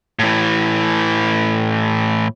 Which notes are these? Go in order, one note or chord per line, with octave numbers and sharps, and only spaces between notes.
A2 E3